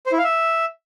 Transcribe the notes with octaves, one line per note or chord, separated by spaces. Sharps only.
C5
E4
F5
E5